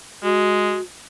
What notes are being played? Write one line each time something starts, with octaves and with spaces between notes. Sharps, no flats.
G#3 F#4